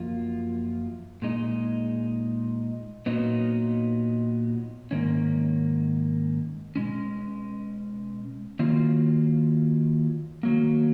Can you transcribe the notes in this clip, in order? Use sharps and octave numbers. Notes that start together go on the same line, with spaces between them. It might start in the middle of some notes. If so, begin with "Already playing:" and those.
Already playing: F#2 F3 A#3 F4
A#2 G#3 D#4
A#2 F#3 B3 D#4
G#2 D#3 A#3 C#4
B2 G#3 C#4
D#3 F#3 A#3 F4
D#3 F#3 A#3